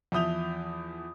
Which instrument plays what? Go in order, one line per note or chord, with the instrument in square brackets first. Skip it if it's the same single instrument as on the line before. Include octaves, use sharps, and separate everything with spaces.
[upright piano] E2 F3 E5 D#6 G6 F7